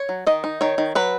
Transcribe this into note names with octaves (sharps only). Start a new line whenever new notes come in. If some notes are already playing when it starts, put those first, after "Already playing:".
Already playing: C#5
F#3
D#3 D#5
D#4
D#3 C#5
D#3
F#3 B4